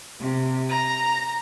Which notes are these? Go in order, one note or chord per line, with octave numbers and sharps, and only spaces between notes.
C3
A#5